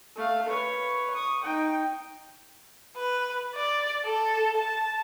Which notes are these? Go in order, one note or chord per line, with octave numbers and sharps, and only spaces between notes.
A3 F5
B4 C#5
C#6 D#6
D#4 G5
B4
D5
A4
A5